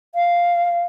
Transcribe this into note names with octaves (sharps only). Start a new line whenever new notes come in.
F5